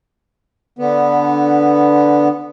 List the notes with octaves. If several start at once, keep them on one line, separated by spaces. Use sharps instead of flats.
D3 B3